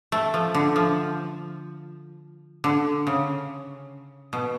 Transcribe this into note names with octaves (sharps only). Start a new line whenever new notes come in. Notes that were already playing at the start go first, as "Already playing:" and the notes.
A3
F3
D3
F3
D3
C#3
B2